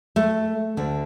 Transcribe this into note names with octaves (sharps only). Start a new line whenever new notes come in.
A3
D2 D3